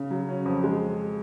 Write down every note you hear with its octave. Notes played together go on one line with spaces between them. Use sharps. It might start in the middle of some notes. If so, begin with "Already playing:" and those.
Already playing: C#3
F#3
C#4
F2
G#3